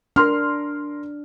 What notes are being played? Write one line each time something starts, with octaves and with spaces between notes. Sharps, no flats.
D4 A#4 C6 F6